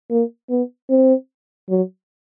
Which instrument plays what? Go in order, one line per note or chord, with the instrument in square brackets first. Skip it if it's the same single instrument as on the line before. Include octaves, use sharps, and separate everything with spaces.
[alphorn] A#3
B3
C4
F#3